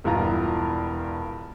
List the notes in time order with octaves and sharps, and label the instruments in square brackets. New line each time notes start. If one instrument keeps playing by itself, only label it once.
[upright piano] E1 G2 E3 F4 A#5